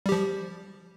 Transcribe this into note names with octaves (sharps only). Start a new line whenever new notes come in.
F3 G3 G4